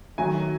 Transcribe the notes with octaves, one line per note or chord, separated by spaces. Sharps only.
D#3 F#3 A3 G#5